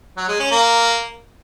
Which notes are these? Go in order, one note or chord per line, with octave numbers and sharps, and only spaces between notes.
F#3
G#3
C#4
A#3